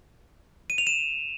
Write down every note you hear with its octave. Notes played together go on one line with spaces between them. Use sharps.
D#7
F7
E7